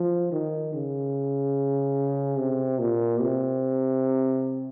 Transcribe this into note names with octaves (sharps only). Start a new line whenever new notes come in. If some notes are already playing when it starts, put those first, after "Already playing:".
Already playing: F3
D#3
C#3
C3
A#2
C3